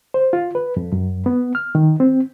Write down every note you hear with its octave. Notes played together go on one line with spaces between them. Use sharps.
C5
F4
B4
F2
F#2
B3
F6
D#3
C4